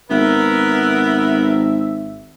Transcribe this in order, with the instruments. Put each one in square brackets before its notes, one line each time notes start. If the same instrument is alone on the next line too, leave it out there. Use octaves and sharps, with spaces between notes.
[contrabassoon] G#1 [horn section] B3 A#4 [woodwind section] E5